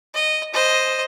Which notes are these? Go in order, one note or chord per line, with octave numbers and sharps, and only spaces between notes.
D#5
C5 D#5